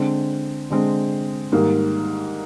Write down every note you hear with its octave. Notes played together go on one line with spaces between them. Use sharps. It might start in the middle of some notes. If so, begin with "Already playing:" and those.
Already playing: D3 G#3 C4
D3 G#3 C4
G#2 D#3 G3 A#3